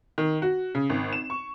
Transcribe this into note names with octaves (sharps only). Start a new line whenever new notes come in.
D#3
F#4
C#3
G#1
E7
C#6